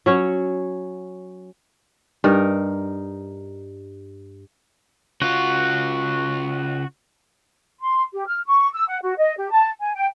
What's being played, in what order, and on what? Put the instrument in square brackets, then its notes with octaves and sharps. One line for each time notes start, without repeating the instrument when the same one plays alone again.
[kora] F#3 C#4 C#5
G2 D#4 A#4
[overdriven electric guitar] C#3 F4 [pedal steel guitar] F#4
[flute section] C6
G4
F6
C#6
E6
F#5
F#4
D#5
G4
A5
G#5
G5